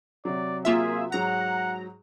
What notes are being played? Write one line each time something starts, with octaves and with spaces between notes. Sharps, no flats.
C3 F#3 D5
A#3 F4 G#4 E5
G#2 F#3 F#5 A#5